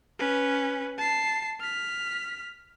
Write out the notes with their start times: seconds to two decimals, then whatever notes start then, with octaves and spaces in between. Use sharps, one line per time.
0.19 C#4 B4
0.98 A5 C7
1.61 F6 B6